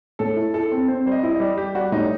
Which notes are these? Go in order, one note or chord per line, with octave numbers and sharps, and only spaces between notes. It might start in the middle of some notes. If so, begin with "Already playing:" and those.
A2 A4
E4
E4 A4
C4
C4 C5
G3 C5
D#5
E4
D#5
G3
G3 G4
G3 F#4
A2 D#4